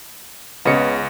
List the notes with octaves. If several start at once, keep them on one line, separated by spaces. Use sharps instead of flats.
C#2 C#3 B3 D#5 C#7